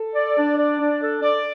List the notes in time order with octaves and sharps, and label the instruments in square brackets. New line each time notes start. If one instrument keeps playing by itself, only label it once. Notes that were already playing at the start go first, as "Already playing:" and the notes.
Already playing: [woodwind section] A4
D5
D4
D5
D4
A4
D5